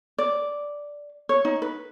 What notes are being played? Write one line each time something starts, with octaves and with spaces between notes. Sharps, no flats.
D5
C#5
D#4
B4